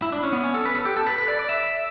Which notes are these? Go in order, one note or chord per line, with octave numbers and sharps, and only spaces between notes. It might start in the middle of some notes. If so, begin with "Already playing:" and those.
E4
D4
C#4
B3
C#4
A4
B4
A4
G4
A4
B4
B4
D5
D5
E5